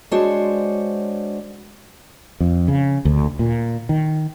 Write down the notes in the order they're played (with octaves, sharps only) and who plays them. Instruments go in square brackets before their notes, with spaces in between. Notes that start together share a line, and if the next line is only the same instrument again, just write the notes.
[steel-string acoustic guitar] G#3 D4 F#4 C5 C#5
[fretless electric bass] F2
C#3
D2
A#2
D#3